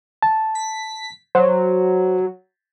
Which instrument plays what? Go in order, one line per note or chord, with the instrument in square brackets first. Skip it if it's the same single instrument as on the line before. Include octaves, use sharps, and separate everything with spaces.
[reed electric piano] A5
[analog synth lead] B6
[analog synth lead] F#3 [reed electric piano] C5